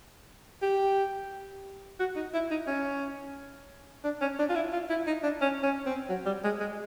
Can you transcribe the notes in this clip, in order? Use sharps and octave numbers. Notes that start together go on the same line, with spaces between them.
G4
F#4
D#4
E4
D#4
C#4
D4
C#4
D4
F4
E4
F4
E4
D#4
D4
C#4
C#4
C4
F#3
G3
G#3
G#3